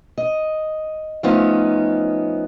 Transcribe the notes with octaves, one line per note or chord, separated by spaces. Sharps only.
D#5
F3 A3 B3 C#4 D#4 F4